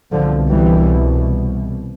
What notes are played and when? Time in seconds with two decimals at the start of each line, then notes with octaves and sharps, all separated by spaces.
0.12 C2 B2 D3 F3
0.50 E3 G3